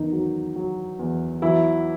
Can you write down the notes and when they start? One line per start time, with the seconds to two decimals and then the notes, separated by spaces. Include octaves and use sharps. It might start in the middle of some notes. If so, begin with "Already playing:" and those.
Already playing: E2 D#3 D#4
0.13 F#3
0.56 F#3
0.99 E2
1.42 E3 F#3 E4